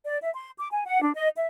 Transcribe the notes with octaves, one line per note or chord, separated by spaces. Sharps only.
D5
E5
C6
D6
G#5
F#5
D4
D#5
E5